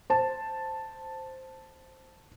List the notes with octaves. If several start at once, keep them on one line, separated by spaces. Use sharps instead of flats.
C5 A5